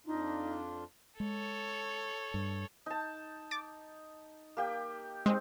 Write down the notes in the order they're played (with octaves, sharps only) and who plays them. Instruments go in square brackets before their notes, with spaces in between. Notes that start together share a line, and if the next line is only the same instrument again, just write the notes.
[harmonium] F2 D4 F4 [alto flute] D#4
[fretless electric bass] G#3 [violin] A4 C#5
[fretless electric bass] G2
[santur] D#4 A5
[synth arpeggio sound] D6 A6
[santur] A#3 G4 G5
[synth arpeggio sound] G#3 [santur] C4 D#4